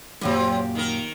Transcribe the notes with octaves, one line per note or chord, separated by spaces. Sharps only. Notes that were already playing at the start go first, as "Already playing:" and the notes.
F#2 A#2 F#3 C4 G4
D#3 A#4